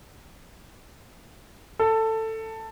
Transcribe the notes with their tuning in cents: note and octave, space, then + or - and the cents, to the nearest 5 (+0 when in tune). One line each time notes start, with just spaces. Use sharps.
A4 +15